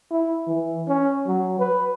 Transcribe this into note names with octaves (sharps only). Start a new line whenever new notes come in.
E4
E3
C#4
F#3
B4